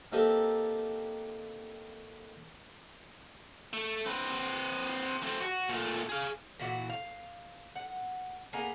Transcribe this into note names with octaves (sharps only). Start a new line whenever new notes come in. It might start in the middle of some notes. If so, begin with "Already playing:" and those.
A#3 C4 D#4 E4 G4 A4
A3
C4 B4
A3 C4
F#4
A#2 A3
G#4 F5
A#2 E3 E4 F#4
F5
F#5
A#3 B3 G#4 A#5